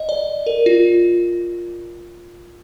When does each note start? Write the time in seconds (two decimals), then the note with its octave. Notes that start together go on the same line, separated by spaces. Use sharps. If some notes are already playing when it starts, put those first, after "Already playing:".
Already playing: D#5
0.09 D5
0.46 A#4
0.66 F4